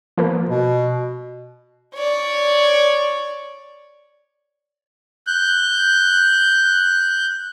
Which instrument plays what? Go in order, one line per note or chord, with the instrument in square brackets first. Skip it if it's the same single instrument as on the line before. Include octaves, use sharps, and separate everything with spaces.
[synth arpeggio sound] F3 A#3 B3
[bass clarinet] B2
[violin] C#5 D5
[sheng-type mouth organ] F#6 G6